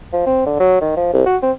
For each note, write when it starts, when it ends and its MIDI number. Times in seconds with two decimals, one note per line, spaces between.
0.13 0.21 53
0.26 0.41 60
0.46 0.57 50
0.60 0.79 54
0.81 0.92 51
0.97 1.11 53
1.14 1.23 36
1.26 1.37 66
1.43 1.51 60